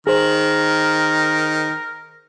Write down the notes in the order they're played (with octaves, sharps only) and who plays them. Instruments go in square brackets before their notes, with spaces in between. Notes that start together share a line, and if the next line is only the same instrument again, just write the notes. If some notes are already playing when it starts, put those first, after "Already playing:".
[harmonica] D#3 [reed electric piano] G#4 C5 [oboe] A#4